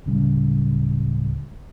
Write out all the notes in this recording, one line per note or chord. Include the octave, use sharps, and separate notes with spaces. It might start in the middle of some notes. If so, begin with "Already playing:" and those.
D1 C#3 G3